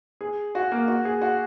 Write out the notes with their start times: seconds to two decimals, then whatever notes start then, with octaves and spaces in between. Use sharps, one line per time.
0.21 G#4
0.55 F#4
0.72 A#3
0.88 F#4
1.05 G#4
1.22 F#4